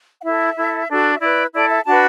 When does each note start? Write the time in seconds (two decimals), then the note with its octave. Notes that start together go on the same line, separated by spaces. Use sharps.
0.20 F#5
0.24 E4 A4 E5
0.57 E4 A4
0.89 D4 F#4 A4
1.13 E5
1.21 E4 B4 D5
1.53 E4 A4 D5
1.69 E5
1.86 D4 F#4 B4 A5